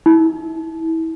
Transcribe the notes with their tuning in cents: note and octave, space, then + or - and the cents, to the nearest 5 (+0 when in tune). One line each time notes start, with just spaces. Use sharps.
E4 -30